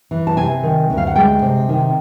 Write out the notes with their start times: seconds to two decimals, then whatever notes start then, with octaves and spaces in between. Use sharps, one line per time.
0.11 E3
0.27 A5
0.37 C3 G#5
0.63 D#3
0.90 D2
0.97 F5
1.07 F#5
1.16 G#3 G5
1.42 C3
1.69 D#3